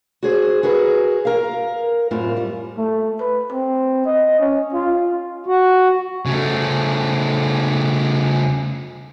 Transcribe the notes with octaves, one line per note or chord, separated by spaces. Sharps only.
F#4 G#4 C5
F#4 G#4 A#4 B4
A#4 F5
F#2 A2 C4 F4
G3
A3
B4
C4
D#5
C#4
F4
F#4
C#3 A3